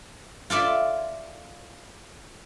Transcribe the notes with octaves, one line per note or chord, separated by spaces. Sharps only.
F4 A4 D5 E5